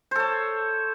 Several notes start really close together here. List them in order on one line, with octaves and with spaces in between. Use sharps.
C5 A4 C#5